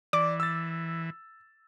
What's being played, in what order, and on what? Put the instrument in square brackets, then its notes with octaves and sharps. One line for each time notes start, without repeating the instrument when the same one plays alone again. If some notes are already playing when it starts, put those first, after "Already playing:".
[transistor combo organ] E3 [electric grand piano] D5 [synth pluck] D6
[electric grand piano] E6 A6